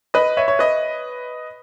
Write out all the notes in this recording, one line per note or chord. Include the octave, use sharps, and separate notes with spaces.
B4 D#5
C#5 E5
C#5
B4 D#5